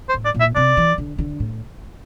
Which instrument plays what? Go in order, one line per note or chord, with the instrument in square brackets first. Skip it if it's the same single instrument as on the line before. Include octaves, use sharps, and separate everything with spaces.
[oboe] C5
[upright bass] A2
[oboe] D5
[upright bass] A#2
[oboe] E5
[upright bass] C3 [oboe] D5
[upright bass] E3
D3
D3
A2